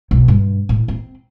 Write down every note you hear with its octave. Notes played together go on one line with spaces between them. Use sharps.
B1
G2
A2
C4